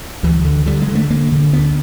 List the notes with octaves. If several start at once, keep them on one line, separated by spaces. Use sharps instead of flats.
D2 E3
D3
D3 G3
G#3
D3
A3
D3 A#3
D3
D2 B3